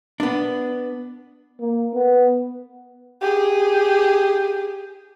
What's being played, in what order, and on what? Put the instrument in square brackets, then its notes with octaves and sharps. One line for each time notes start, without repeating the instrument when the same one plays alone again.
[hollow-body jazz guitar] B3 D4
[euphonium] A#3
B3
[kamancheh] G4 G#4